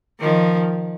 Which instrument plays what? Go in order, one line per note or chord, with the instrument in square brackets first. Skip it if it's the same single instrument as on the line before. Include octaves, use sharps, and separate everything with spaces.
[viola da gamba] D#3 F3